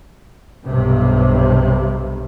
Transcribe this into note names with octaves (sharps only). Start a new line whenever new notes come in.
B1 G2 C3